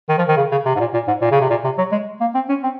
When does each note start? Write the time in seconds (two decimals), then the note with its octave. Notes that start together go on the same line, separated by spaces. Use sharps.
0.09 D#3
0.18 F3
0.28 D#3
0.37 C#3
0.51 C#3
0.65 C3
0.75 G#2
0.80 A#2
0.94 A#2
1.08 G#2
1.21 A#2
1.31 C#3
1.41 C3
1.50 A#2
1.64 C3
1.78 F#3
1.92 G#3
2.21 A#3
2.34 C4
2.49 C#4
2.64 C4